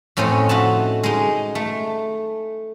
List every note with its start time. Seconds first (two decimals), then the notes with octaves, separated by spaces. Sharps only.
0.17 F2 A2 C#4 A4 C5 D#5
0.49 D#4 F#4 E5 A5
1.03 G#3 D#4
1.55 A3